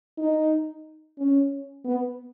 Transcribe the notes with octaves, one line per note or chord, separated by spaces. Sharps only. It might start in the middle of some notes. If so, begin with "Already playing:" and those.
D#4
C#4
B3